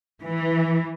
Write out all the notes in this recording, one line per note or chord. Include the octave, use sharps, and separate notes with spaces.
E3